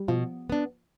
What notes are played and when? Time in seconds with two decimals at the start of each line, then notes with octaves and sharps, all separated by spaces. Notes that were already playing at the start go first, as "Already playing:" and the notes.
Already playing: G3
0.08 B2 F3
0.50 B3 D4